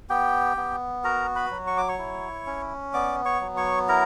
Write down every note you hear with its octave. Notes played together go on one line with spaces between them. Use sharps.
B3 G4 G5
B3
F#4 A#4 A#5
B4 B5
F#3
C#6
D6
C#5 C#6
E4
C#4
B3 D5 D6
C#5 C#6
F#3
C#5 C#6
E4 A#4 A#5